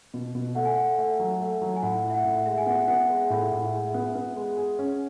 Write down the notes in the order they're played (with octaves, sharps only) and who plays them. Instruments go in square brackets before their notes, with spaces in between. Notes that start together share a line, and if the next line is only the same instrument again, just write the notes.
[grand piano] B2
B2
[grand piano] A3 [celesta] F#5
[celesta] G#5
[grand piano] A3 [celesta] F#5
[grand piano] A3
F#3
A3
F#3
[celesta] G#5
[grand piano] A2 [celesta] F#5
[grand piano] E4
[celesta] E5
F#5
[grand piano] A2
[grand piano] G#3 [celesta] E5
[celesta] G#5
[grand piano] B3 [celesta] F#5
[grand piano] B3 [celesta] F#5
[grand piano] G#3
A2
A2
G#3
B3
B3
G#3
G#4
C#4